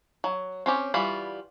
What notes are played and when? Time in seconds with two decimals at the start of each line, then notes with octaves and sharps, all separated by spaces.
0.24 F#3
0.66 C4 C#4 G4
0.94 E3 G3 F4 F#4 B5